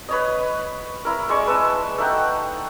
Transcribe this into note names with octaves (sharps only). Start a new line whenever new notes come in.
B4 C#5 D#5
E4 A#4
G#3 D5 C#6
B4 E5 A5
A3 D#4 F#5 G5